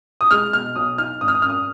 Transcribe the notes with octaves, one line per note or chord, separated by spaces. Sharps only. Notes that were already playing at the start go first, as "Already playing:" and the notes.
D#6
G#3 F6
B2 F6
B1 D#6
D#4 F6
G#1 D#6
F6
D#6
F#2 F6
D#6